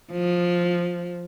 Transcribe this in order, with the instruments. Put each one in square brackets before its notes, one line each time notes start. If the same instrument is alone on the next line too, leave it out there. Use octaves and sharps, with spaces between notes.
[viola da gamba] F3